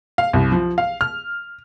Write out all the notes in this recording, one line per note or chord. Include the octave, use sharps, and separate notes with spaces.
F5
C2
F3
F5
F6